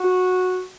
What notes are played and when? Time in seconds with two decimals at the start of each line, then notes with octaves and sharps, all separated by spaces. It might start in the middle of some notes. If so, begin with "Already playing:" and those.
Already playing: F#4